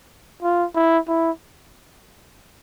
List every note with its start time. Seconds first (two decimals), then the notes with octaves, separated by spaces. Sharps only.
0.42 F4
0.75 E4
1.08 E4